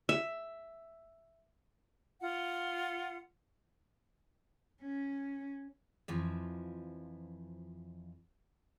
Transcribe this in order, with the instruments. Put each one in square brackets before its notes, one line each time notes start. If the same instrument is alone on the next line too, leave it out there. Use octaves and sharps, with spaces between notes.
[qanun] E5
[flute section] F4 F#5
[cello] C#4
[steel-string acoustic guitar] F2 E3 F3